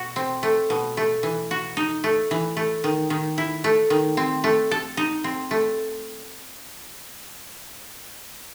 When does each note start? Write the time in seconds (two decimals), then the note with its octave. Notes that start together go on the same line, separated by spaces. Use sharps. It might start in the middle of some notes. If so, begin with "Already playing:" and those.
Already playing: B2 F#4
0.16 C4
0.43 A3
0.70 B2
0.97 A3
1.23 E3
1.51 F#4
1.77 D#4
2.04 A3
2.31 E3
2.57 A3
2.84 D#3
3.10 D#3
3.38 E4
3.64 A3
3.90 D#3
4.17 C4
4.44 A3
4.71 A4
4.97 D#4
5.24 C4
5.51 A3